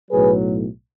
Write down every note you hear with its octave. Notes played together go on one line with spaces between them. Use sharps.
B1 A2 F#3 G#4 B4